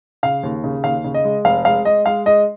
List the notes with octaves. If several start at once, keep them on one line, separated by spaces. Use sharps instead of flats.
C#3 F5
D#2
C#3
D#2 F5
C#3
D#5
G#3
F1 F5
G#3 F5
G#3 D#5
G#3 F5
G#3 D#5